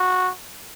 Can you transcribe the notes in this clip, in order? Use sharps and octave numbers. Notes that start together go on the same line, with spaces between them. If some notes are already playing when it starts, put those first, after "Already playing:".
Already playing: F#4